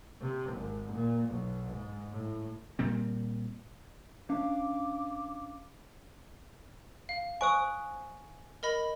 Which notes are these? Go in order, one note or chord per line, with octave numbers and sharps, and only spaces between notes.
C3
G#1
A#2
B1
G#2
A2
A#2 G3 C4
C#4 D4 F5 D6
F5
C5 G#5 C#6 D#6
A#4 D#5 B5